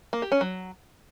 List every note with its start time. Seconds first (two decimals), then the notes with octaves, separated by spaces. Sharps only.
0.13 A#3
0.22 G4
0.32 C#4
0.41 F#3